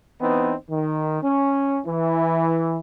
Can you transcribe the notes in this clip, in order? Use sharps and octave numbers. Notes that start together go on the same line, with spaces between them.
E3 B3 C4 D#4
D#3
C#4
E3